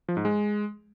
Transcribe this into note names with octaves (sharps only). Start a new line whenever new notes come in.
F3
G#2
G#3